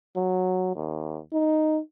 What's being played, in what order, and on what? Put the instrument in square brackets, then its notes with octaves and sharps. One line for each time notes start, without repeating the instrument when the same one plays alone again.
[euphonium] F#3
D#2
D#4